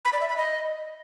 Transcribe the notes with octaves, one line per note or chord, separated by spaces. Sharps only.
B5
D5
E5
B5
D#5